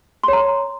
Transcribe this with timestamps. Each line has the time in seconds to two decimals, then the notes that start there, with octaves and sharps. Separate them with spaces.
0.24 C6
0.28 C#5
0.33 A#5